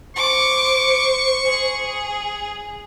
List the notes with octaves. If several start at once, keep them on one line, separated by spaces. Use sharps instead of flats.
C5 C#6 D6
G#4